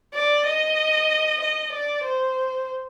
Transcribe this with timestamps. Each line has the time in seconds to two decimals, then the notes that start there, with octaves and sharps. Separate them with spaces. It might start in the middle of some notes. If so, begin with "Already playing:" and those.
0.15 D5
0.47 D#5
1.41 D#5
1.73 D5
2.04 C5